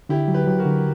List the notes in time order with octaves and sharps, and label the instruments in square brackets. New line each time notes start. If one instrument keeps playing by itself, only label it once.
[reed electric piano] D3 [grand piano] E4 G4
[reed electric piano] F#3
[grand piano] G4 B4
[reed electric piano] F#3
[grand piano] F#4 A#4
[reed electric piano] D3